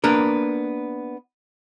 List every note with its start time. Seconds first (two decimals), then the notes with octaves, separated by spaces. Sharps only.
0.04 A#3 B3 D4 A#4